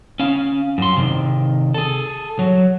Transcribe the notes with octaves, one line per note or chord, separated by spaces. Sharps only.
C#4 F5
F#2 C6
C3 D#3
G#4 A4
F#3